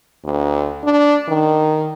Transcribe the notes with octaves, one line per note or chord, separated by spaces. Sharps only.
D2
D4
D#3